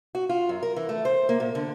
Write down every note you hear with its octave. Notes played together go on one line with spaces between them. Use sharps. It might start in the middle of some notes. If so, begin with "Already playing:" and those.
F#4
F4
F#2
A#4
E3
A3
C5
A#3
A#2
D3